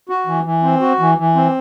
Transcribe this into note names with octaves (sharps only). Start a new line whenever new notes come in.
F#4
E3
E3
C4
F#4
E3
E3
C4